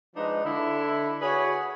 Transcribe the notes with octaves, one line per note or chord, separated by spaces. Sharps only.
F3 G#3 D4 D#4 B4 D#5
D3 E4
E4 F#4 G#4 B4 C#5